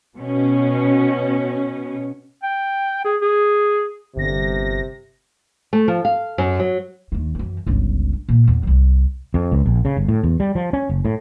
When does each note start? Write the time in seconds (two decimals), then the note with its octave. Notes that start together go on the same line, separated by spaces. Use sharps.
0.18 B2 C#4
2.43 G5
3.05 G#4
3.22 G#4
4.16 G1 C3 A#6
5.73 A3
5.88 F3
6.05 F5
6.38 F#2
6.60 F#3
7.12 D#2 D#3
7.35 F#2 E3
7.67 G1 C#2
8.29 A#2
8.48 E2
8.63 C2 F#3
9.34 F2
9.52 C#2
9.66 A#1
9.85 C#3
9.97 G1
10.08 A2
10.23 E2
10.40 G3
10.55 F3
10.73 C#4
10.90 F#1
11.05 A2